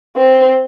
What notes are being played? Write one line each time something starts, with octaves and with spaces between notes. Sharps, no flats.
C4